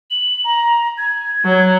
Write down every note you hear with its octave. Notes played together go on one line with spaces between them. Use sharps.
F#7
A#5
G#6
F#3